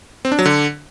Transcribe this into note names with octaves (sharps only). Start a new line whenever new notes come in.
C4
D4
F#3
D3